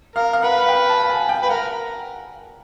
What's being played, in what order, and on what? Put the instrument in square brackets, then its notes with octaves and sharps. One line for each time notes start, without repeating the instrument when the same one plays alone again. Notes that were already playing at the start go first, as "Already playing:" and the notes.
[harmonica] A#4 [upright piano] F5
[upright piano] F5
[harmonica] B4 [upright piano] F#5
[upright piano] F#5
G5
A5
G#5
G5
[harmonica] B4
[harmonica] A#4 [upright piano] F#5